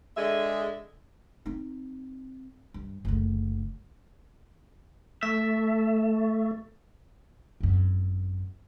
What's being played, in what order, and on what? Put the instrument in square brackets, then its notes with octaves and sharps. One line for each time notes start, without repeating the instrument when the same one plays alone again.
[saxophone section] D3 G#3 G#4 E5
[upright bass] C4 D#4
G2
F#1 D2
[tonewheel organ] A3 [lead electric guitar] E5
[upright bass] G#1 F#2